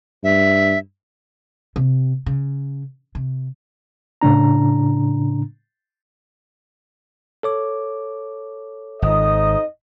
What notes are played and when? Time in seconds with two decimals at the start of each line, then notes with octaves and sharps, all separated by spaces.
0.24 G2 E5
1.76 C3
2.26 C#3
3.15 C3
4.22 A2 C#3 D4 A#5
7.43 A4 C#5 D6
9.02 G#1 F2 D#4 D#5 D#6